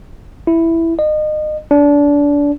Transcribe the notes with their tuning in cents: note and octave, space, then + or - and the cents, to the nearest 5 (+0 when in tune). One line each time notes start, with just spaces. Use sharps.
E4 +0
D#5 -30
D4 -25